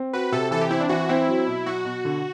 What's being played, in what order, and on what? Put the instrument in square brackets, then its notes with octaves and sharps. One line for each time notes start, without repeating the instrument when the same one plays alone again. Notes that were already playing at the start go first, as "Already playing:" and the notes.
Already playing: [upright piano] C4
[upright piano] F#4 [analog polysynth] B4
[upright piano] C3 [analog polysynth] A4
[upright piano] E3 [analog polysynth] A4
[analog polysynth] G4
[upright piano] C4 [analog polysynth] E4
[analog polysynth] D4
[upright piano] E3 [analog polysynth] F#4
[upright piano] C4 [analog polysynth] E4
[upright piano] F#3
B2
[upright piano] F#3 [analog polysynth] F#4
[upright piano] B2
D3